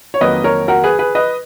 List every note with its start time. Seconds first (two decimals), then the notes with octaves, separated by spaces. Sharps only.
0.14 C#5
0.21 F2 D#3 F#3 A#3 B4 D#5
0.44 A#4 C#5
0.68 F#4 A#4
0.84 G#4 B4
0.99 G#4 B4
1.15 B4 D#5